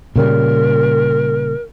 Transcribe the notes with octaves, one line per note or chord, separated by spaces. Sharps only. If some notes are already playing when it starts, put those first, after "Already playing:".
A#2 C#3 G3 A#4